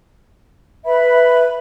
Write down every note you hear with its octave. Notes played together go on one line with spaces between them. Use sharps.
B4 E5 B5